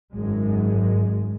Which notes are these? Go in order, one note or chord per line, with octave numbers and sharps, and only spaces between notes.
G#1 F#2 G#3